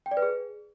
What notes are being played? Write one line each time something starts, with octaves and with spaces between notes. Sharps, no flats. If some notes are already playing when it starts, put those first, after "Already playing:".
G5
D5
B4
G#4